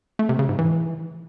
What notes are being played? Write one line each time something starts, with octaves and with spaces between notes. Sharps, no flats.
A3
C3
C#3
G#2
E3